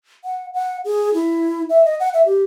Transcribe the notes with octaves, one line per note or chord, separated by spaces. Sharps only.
F#5
F#5
G#4
E4
E5
D#5
F#5
E5
G4